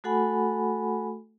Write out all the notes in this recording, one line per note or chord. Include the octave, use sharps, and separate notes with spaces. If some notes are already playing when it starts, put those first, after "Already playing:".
A3 F#4 A4 F#5 G#5 B5